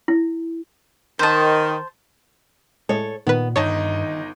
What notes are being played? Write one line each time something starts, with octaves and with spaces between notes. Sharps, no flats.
E4
D#3 C5 A5
A2 G#3 A4 C#5
A#2 D#3 B3 B4
G1 G2 D#3 D#4 C#5 D#5 A5 C#6